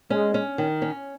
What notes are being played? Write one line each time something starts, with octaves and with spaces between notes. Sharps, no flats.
G#3 C#4
C#4
D#3
C#4